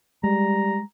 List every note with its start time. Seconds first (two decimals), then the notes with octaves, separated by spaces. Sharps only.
0.24 G3 G#3 A#5